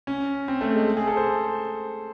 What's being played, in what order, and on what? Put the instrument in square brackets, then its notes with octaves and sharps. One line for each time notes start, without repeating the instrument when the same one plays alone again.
[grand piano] C#4
C4
A3
G#3
G#4
A4
C5